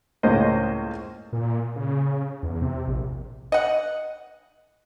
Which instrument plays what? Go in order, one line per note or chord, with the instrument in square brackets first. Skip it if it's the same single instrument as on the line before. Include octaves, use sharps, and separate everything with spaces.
[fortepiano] C#2 A2 A#3 C#4 C5 D#5
[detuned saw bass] A#2
C#3
E2
C3
A#1
[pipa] D#5 F#5